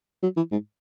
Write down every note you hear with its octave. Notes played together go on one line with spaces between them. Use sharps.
F#3
E3
G#2